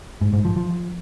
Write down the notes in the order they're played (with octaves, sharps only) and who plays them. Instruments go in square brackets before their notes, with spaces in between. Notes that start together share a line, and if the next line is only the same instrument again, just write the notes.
[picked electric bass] G#2
G#2
F3
F3